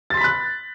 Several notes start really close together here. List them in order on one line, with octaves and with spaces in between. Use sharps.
A6 C6 B6 B5 F#6